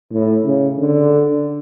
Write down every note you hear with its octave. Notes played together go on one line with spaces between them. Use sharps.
A2
C#3
D3